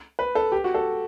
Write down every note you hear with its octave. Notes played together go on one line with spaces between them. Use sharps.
B4
A4
G4
F#4
A4